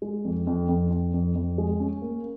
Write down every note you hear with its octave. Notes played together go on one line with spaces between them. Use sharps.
G#3
F2
F2
F2
F2
F2
F2
G#3
C#4
A#3